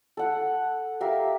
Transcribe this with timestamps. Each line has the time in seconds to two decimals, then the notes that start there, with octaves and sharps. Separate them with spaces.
0.17 A4 F#5
1.01 G4 A#4 E5 F5